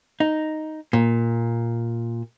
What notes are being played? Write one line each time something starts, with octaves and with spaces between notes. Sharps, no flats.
D#4
A#2